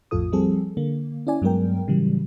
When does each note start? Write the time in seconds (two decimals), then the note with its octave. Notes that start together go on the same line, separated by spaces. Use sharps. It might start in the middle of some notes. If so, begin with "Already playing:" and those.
0.11 A#1 F2 A2 F4 A4 D#6
0.32 F3 G3 C4 G#4 A4
0.77 D3 A#3
1.27 C#4 E4 D5 G#5
1.42 G2 F#3 G#3 B3 A#4 G5
1.87 A2 C#3 E3 F#3 G3